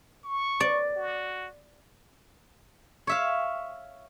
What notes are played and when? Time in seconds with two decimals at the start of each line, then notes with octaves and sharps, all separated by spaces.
0.24 C#6
0.60 D5
0.95 F#4
3.07 C#5 E5 F5